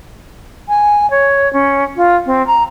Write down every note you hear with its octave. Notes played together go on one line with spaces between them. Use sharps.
G#5
C#5
C#4
F4
C4
A#5